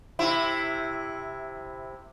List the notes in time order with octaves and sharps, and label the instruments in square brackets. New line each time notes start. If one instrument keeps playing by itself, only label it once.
[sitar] C3 E4